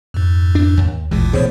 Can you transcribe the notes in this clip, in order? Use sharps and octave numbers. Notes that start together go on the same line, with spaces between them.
F2 G#2
D4
D#2
G#1 D#2 A#2 E3 G#3
B2 E3 A3 G#4 C5 C#5